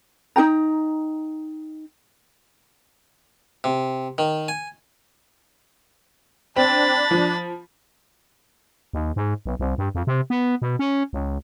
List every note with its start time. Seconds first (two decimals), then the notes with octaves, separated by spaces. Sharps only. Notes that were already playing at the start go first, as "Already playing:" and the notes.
0.36 D#4 G#4 G5 A#5
3.64 C3
4.18 D#3
4.48 G#5
6.56 C4 D4 B5 A6
7.11 F3
8.93 D#2
9.16 G#2
9.46 B1
9.60 C2
9.78 G2
9.95 F2
10.07 C3
10.30 B3
10.62 B2
10.79 C#4
11.13 C#2